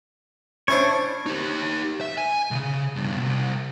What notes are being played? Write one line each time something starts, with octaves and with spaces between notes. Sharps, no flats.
C#4 D4 E4 C5 C#5
D#4 G4
E5
G#5
C2 C#3
G2 B2
C2